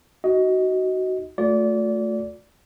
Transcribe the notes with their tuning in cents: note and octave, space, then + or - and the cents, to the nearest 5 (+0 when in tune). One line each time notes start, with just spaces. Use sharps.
D#4 +0 F#4 +15 D#5 +20
A3 +0 F4 +45 D5 -25